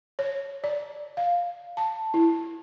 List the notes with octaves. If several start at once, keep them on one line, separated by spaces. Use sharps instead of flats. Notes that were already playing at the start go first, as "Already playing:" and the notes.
C#5
D5
F5
A5
E4